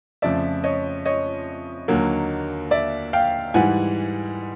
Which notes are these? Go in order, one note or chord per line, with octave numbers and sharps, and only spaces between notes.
F2 C#3 F3 A3 D5 E5
C#5 D#5
C#5 D#5
D#2 D3 F#3 A#3
D5 E5
F5 G5
G#2 E3 G3 F#5 G#5